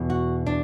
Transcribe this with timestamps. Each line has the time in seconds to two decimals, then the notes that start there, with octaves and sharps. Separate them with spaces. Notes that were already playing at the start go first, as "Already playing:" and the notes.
Already playing: E2 B2
0.10 F#4
0.47 D4